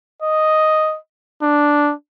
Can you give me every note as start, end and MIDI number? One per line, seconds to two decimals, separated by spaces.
0.22 0.98 75
1.42 1.93 62